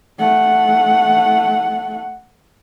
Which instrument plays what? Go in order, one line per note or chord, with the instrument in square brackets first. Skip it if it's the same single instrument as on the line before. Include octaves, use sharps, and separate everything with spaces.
[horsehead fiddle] A3 F#5